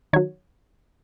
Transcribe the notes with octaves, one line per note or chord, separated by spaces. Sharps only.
D#3 F#3 C#5